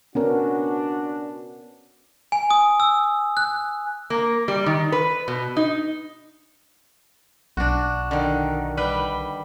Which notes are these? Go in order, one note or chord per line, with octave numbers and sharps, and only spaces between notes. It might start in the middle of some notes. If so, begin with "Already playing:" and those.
B3 C#4 D4 F#4 A#4
G#5
D#6
E6
F#6
A#3
G3
D#3
B4
B2
D#4
B1 D4 F#4
D3 D#3
G3 B4 G5